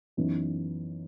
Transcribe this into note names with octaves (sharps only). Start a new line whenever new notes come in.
F#2 E3 B3 D#4